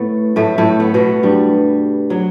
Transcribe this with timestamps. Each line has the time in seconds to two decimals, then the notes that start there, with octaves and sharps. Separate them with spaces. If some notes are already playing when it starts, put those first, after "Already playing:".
Already playing: A2 A3 B3
0.36 A2 A3
0.58 A2 A3
0.80 B3
0.94 B2 B3
1.23 G2 G3
2.10 F#3